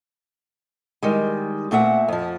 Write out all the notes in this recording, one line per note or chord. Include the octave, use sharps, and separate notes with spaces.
D#3 G3 G#3
A#2 A3 C4 E5 F#5
F2 F3